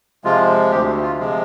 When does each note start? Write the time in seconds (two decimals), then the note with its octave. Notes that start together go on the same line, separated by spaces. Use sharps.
0.24 C3 F3 G#3 F4
0.71 D2 G4
1.03 F4
1.19 C3 F3 G#3